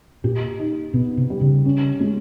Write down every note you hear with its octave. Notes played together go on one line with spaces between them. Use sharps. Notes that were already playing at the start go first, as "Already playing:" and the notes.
A#2 G4
D#4
B2 B3
C3
G3
C#3
C#4
G#3